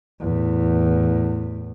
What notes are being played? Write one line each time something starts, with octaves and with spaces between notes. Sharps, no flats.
E2 A2